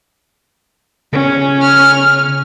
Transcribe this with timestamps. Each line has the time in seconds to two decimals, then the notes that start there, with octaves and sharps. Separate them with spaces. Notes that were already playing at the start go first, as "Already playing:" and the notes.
1.13 C#3 C#4
1.62 F6